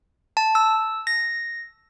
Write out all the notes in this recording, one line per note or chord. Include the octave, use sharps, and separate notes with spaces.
A5
E6
A#6